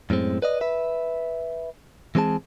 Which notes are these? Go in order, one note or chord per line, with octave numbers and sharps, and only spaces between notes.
F#2 A2 G#3 C4
B4 D5 D#5
B4 E5
E3 G#3 C4 G#4 A5